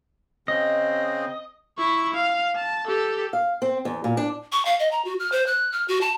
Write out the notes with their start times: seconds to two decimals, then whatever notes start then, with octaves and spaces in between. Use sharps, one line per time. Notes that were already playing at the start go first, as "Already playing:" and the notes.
0.48 C#3 C4 D#5
1.78 E4 C#6
2.14 F5
2.56 A5
2.87 G4 A4
3.33 F5
3.62 C4
3.85 E2
4.04 A#2
4.17 D4
4.52 C#6
4.65 F5
4.79 D#5
4.91 A#5
5.05 F#4
5.19 F6
5.32 C5
5.46 F#6
5.72 F6
5.88 F#4
6.01 A5